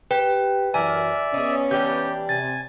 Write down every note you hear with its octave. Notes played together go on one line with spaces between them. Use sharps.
G4 B4 G5
F#2 E3 A#4 D5 E5 G#5
B3 C#4 D#4 G#4
E3 G3 D4 G4 G6
C3 G#5 A6